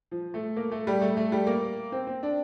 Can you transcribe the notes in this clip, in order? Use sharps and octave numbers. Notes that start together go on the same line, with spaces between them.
F3
A3
A#3
A3
G3
A3
A3
G3
A#3
C4
C4
D4